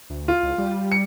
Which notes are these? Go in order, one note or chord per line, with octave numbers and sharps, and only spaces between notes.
D2
F4
C#2
G3
C#7